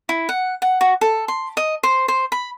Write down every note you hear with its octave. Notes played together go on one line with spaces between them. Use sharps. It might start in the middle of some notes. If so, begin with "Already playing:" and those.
E4
F#5
F#5
F#4
A4
C6
D#5
C5
C5
B5